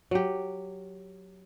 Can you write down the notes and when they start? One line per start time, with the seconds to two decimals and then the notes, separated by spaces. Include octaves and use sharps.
0.11 F#3 G4